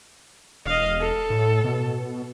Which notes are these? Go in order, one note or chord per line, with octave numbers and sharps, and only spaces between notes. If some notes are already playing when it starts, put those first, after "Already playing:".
E1 D#5 F5
A4
A2
B2